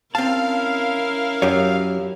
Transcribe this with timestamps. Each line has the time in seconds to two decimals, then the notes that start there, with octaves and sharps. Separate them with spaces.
0.15 C4 C#4 E4 A#4 F5 A5
1.42 F#2 G4 C#5